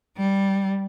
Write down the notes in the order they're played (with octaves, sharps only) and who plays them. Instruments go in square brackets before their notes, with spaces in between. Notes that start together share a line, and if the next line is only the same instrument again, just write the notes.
[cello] G3